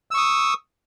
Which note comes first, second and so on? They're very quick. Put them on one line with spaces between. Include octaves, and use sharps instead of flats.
E6 C#6 D#6